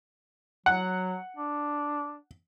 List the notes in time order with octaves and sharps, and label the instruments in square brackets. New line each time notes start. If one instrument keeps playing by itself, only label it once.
[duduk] F#3 [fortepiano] F#5
[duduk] D4